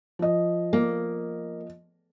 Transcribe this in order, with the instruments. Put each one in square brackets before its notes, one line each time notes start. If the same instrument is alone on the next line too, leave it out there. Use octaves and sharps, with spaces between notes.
[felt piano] F3 D#5
[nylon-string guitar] A#3